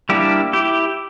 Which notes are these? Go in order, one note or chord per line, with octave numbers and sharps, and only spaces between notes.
G3 A#3 D4 E4 G4
E4 G4